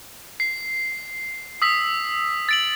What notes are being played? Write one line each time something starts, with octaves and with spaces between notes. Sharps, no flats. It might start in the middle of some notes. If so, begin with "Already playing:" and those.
C7
D#6 E6 B6
A6 D7 F#7